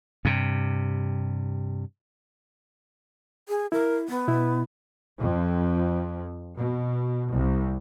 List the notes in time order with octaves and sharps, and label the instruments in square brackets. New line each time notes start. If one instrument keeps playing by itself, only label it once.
[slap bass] G2 C3
[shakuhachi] G#4
[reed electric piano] E4 [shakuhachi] A#4
[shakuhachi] B3
[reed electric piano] B2 E4
[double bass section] F2
B2
C2